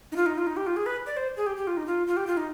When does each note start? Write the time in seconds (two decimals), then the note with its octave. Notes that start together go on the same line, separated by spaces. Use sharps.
0.12 D#4
0.16 F4
0.26 D#4
0.38 F4
0.47 D#4
0.57 G4
0.67 F4
0.76 G#4
0.86 B4
1.06 D5
1.17 C5
1.37 G#4
1.47 G4
1.57 G4
1.67 F4
1.77 D#4
1.87 F4
2.07 F4
2.17 G4
2.27 F4
2.37 D#4